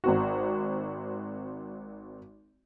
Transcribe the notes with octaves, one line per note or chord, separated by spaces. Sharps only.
G#1 C4 F#4